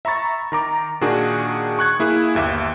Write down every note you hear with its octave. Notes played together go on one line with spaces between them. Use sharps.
E5 A#5 B5 C#6 A6
D#3 A#5 D6
A#2 D#3 D4 F#4 G#4
C#6 F#6 G#6
A#3 E4 G#4
G1 D#2 E5 D6